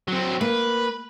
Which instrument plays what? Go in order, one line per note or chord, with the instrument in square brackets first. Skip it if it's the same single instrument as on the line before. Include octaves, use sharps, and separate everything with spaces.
[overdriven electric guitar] F#3 C4
[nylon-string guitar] A#3 [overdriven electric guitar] B4